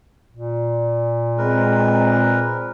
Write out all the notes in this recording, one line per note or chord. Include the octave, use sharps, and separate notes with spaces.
A#2
G#3 C4 A#4 B4